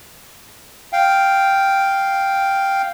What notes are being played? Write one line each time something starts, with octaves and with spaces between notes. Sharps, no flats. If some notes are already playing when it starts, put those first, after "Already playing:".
F5 G5